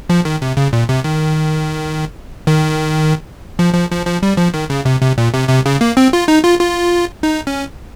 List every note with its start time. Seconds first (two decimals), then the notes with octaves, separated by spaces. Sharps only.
0.10 F3
0.25 D#3
0.42 C3
0.57 C#3
0.73 A#2
0.89 C3
1.04 D#3
2.47 D#3
3.59 F3
3.74 F3
3.91 F3
4.06 F3
4.23 G3
4.37 F3
4.54 D#3
4.70 C#3
4.85 C3
5.01 C3
5.18 A#2
5.34 C3
5.49 C3
5.66 C#3
5.81 A#3
5.97 C4
6.13 F4
6.28 D#4
6.44 F4
6.60 F4
7.23 D#4
7.47 C#4